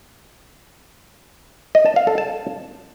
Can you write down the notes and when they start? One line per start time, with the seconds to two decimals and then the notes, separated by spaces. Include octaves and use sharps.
1.75 D#5
1.86 A5
1.96 F5
2.07 A4
2.18 A5